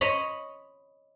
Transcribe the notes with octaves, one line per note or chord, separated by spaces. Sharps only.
C#5 D#5 B5